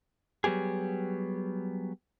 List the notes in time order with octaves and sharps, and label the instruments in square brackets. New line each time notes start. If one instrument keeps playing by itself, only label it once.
[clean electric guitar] F#3 G3 B3 G4 G#4